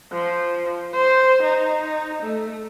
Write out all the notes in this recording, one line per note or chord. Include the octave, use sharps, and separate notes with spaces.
F3
C5
D#4
A3